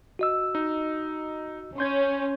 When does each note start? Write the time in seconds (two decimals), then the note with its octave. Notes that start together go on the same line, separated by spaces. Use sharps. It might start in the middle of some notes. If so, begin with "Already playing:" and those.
0.19 F#4 D#5 E6
0.55 D#4
1.78 C#4 C6 G6 G#6